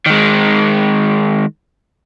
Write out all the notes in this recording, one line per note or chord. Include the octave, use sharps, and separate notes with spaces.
D#3 G#3